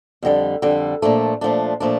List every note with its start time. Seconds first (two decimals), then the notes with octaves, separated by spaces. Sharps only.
0.23 F2 D3 G3
0.62 F2 D3 G3
1.02 A#2 F3 A3 D4
1.41 A#2 F3 A3 D4
1.80 A#2 F3 A3 D4